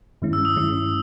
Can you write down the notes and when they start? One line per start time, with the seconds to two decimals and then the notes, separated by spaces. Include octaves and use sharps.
0.22 G2 D#3 G#3 C#4 E4
0.33 E6
0.45 D#6
0.56 G2 D#3 G#3 C#4 E4